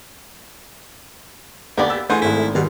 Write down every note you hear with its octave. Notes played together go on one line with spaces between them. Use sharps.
D2 A#3 B3 D4 G4 D5 F#5
E6
E3 A3 G#4 C5 F#5 G6
G#1 G#2 E4
G#2 B2 D#3 G3